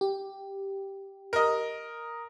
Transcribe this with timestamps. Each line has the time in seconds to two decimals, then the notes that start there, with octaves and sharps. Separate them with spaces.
0.01 G4
1.33 A#4 D#5